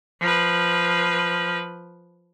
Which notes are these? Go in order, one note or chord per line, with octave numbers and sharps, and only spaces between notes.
F3 B4